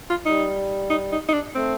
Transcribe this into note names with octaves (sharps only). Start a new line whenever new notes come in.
F4
G3 D#4
D#4
D#4
D#4
D4
A3 C4